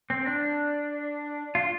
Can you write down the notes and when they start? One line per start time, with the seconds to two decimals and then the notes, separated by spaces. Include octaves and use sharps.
0.10 C4
0.26 D4
1.55 F4